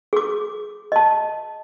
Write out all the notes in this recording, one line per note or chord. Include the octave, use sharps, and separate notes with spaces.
G#4 D6
D#5 A5